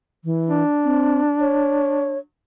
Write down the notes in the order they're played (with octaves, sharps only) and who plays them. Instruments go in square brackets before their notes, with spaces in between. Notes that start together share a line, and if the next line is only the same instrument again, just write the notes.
[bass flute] E3
[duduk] D4
[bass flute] C4
C#5